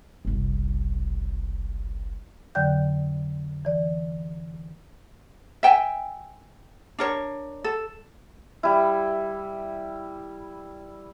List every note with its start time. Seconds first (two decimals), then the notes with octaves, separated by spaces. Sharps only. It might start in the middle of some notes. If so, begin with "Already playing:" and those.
0.25 F#1 C2
2.55 F2 D3 F#3 D5 G5 G6
3.65 E3 D5
5.63 E5 G5 G#5
6.99 D4 A#4 C#5
7.64 A4
8.63 G3 E4